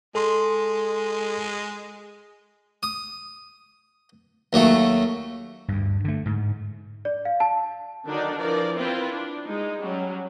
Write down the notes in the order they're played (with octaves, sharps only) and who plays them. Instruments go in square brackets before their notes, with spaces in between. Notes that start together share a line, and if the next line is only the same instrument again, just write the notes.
[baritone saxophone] G#3 [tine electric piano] A4 C6
[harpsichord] D#6
D#2 F#3 A3
[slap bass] D2 G2
D3 A3
G#2
[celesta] D5
F5
A5
[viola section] D3 D#3 F#3 D4 D#4 D5
E3 F3 A#4 D5
C4 E4 F4 B4
D4
G#3 D#4
F#3 G3 C#4